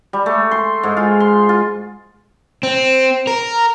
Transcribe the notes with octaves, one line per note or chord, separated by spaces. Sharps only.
G3
A3
C6
G#2
F4
C6
F4
C4
A#4